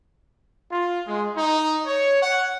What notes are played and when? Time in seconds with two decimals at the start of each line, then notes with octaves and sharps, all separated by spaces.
0.72 F4
1.06 G#3
1.36 D#4
1.86 C#5
2.23 F#5